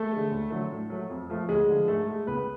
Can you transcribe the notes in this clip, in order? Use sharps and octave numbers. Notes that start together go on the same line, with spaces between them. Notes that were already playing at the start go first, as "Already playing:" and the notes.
Already playing: A3 A4
D3 G#3
D2
D3 F#3 A3
A2
F#3 A3
F2
F3 A3
D2 G#3 G#4
D3 F3
G#2 A3 A4
G#3
C#2 B3 B4